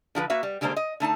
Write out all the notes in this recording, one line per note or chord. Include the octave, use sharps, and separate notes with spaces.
D3 F3 F#4 B4
A#3 F#4 B4 E5
G3
D3 G3 G#3 A#3 D4 C5
D#5
D3 A3 D#4 A5